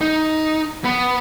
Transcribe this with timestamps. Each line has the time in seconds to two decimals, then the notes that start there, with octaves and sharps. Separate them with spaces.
0.01 D#4
0.84 B3